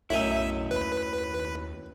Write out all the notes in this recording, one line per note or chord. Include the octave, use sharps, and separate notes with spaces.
B1 F#2 A2 E4 D#5 E5 G#5
D#2 B4